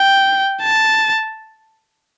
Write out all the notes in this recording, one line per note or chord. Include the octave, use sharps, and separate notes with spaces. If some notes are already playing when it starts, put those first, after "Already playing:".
Already playing: G5
A5